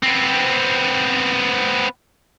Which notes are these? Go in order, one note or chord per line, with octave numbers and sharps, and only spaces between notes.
B3 C4